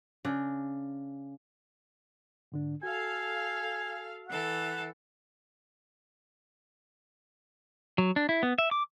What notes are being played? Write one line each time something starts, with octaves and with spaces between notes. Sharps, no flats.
C#3 D4
G#2 D3 D4
F#4 A4 F5 G#5
E3 A4 F#5
F#3
D4
E4
B3
E5
D6